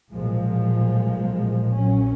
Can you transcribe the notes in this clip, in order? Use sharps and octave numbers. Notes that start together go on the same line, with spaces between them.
B1 A#2 F3 G#3
A#1 A#2 F#3 C#4